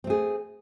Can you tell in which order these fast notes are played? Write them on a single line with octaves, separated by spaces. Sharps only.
C4 A3 G#4